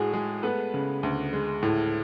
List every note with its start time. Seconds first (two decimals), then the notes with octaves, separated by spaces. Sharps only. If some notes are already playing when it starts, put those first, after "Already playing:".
Already playing: A2 G#3 F#4 G#4
0.14 G#3 G#4
0.43 A3 B3 B4
0.74 C#3
1.03 D2
1.33 G#3
1.63 A2